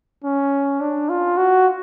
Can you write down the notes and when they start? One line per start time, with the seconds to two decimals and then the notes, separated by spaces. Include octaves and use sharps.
0.24 C#4
0.81 D4
1.09 F4
1.37 F#4